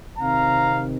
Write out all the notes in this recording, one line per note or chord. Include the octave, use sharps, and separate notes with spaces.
C3 D#3 C4 F5 A#5